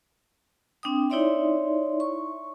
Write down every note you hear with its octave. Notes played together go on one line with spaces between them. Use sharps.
C4 D4 G5 D#6
D#4 E4 C#5 D5 E5 C6
C#6